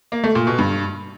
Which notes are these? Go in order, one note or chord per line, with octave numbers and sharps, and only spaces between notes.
A#3
A3
A#2
B2
G2